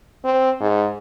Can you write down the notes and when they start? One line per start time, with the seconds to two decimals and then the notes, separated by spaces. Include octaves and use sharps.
0.25 C4
0.61 G#2